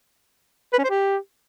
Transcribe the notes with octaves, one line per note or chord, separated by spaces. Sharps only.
B4
C#4
C5
G4